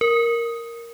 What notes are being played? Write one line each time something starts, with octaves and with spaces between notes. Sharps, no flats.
A#4